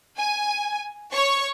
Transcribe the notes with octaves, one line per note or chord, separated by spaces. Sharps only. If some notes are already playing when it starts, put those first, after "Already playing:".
G#5
C#5 C#6